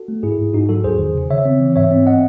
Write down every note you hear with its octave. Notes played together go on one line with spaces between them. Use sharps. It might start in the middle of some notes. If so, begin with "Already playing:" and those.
Already playing: F#4 A4
A3
G#2 E4 G#4
G#2
G#2 D#4 F#4
F#3 F#4 A4
E2 G#4 C5
D#3
C#3
C#3 C#5 E5
C4
E3
G#2 C#5 E5
C4
C4 D#5 F#5